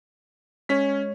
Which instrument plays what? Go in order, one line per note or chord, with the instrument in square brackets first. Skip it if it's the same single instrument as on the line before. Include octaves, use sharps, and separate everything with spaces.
[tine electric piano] G#3 C#5 [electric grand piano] C#4 B6